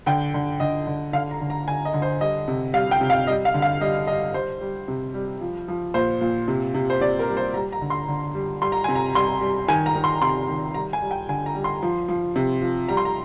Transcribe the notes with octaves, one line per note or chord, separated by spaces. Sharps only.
D3 G5
D3
D3 D#5
D3
D3 F5
A#5
D3
A#5
D3 G#5
D#5
D3
C5
G3 D#5
C3
G3 F5
G5
C3
F5
G3 D#5
F5
D3
F5
G3 D#5
G3 D#5
G3 C5
G3
C3
G3
F3
F3
A#2 C5
A#2
C3
C3
C5
C3 D5
A#4
G3
C5
G3 A#5
A#5
D3
C6
D3
G3
G3 C6
A#5
C3 G#5
A#5
G3 C6
G3
D#3 G#5
A#5
D#3
C6
C3 C6
D#3
G3 A#5
G#5
G3
G5
D3 G#5
A#5
G3
C6
F3
F3
C3
F3
G3 A#5
C6
A#5